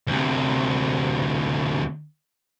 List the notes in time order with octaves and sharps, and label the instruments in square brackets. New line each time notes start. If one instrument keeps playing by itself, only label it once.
[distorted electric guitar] D2 C3